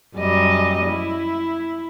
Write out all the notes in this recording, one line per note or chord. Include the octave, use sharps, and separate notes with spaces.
F#2 G3 D#5
E4